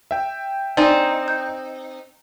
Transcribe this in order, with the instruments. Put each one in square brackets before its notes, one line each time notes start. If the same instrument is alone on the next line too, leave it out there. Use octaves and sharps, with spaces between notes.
[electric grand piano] E5 G5
[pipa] C4 [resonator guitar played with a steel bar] D#4 [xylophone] D5 G#5
[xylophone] G6